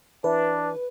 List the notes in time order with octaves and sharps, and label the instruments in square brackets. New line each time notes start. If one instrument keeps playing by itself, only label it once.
[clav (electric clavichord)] E3 [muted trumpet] D4 [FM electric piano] B4